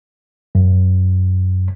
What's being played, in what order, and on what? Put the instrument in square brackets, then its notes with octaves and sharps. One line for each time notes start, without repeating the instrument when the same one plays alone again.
[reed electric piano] F#2